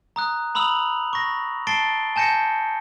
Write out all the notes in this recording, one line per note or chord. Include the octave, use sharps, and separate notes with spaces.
A#5 D#6 F#6
A#5 B5 D#6 E6 F7 F#7
C#6 A#6
A5 A6 C7 D7 G7
G#5 A5 G6 A#6 C#7